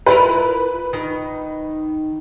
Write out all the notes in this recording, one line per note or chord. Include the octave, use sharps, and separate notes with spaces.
E4 F4 A#4 B4
D#3